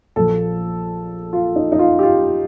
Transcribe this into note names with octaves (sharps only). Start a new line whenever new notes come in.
A#1 A#2 F3 A4
F4
D#4
D#4
F4
G4
F4